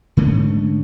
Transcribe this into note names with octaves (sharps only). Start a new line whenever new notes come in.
G#2 D3 A3 C#4